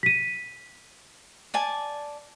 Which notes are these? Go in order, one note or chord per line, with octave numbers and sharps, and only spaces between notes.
B6 D#7
D5 G#5 A5